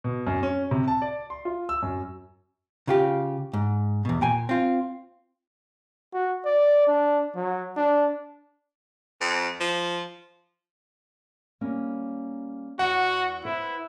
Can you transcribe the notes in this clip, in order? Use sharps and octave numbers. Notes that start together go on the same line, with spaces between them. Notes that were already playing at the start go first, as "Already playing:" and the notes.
B2
F#2
C#4
C3
A5
D5
C6
F4
E6
F#2
C#3 F4 G4
G#2
E2 B2
A#2 G5 G#5
C4 F4
F#4
D5
D4
F#3
D4
F2
F3
G3 A#3 C#4
E2 F#4 F#5
E4 B4 C5